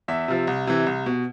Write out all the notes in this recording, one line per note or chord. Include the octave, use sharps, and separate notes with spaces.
E2 E5
C3 F3
C2
C3 E3
C2
B2